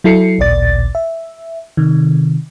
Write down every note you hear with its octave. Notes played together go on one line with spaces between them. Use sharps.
F#3 E4 A4 C7 C#7
A1 D2 A#2 D5 A6
E5
C3 D#3